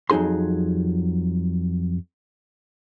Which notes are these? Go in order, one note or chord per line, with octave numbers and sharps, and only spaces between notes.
F2 F#3 D#4 G#4 C6